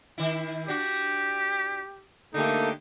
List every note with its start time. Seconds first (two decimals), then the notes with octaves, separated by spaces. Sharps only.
0.18 D#3 E4
0.68 D4 F#4 G4
2.34 D3 A3 A#3 D#4 G4 A4